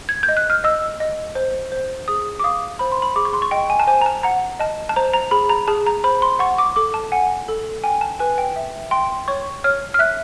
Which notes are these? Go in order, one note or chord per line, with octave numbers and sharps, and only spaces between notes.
G#6
G6
D#5
F#6
F6
D#5 E6
D#5
C5
C5
G#4 D#6
D6
F5 D#6
C5 B5
C6
B5
G#4 D6
C#6
C6
C#6
D#5 G5
G#5
A5
C5 G#5
A#5
A5
F#5 A#5
D#5 A5
A5
C5 A#5
A#5
G#4 B5
A#5
G#4 A5
A#5
C5 B5
C6
F#5 C#6
D6
A4 D6
A5
F#5 G#5
A4
G5 G#5
A5
B4 G#5
G5
E5
G5 C6
C#5 C#6
C#5 F6
F6
E5 F#6